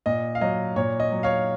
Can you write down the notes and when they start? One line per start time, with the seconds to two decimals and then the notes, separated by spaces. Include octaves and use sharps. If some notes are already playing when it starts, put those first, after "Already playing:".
0.06 A#2 D#5
0.35 F5
0.41 F#3 D#5
0.76 A#2 C#5
1.00 D#5
1.12 F#3
1.23 C#5 F5